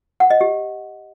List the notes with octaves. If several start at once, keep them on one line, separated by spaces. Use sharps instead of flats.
F#5
D#5
G4